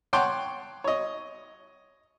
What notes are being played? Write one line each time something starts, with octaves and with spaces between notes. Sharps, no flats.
C#5 F#5 G5 A5 C6 D6
C#5 D#5